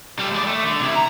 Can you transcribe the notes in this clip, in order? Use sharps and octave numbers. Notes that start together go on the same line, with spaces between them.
G3 A4
G#3 D5
A3
D3
C3 E4
A#5